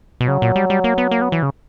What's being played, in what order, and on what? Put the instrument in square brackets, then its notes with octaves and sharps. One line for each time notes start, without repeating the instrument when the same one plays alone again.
[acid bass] B2
[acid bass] C#3 [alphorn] F#3
[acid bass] A#2
G3
G3
A#3
B3
A#3
B3
E3
C#3